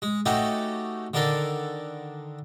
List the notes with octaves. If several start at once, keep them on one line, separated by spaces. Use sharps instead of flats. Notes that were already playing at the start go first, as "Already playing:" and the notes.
G#3
A3 C#4 D#4 F#4 G4 A4
D3 D#3 D4 A4 A#4